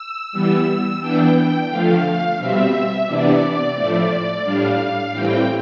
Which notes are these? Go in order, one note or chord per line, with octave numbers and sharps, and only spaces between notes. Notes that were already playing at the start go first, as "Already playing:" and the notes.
Already playing: E6
E3 G3 B3
E3 B3 D4 G5
D3 F3 A3 F5
B2 G3 C4 E5
C3 E3 B3 D4 D5
A2 F3 A3
A2 G3 D4 F5
A2 E3 G3 C4 G5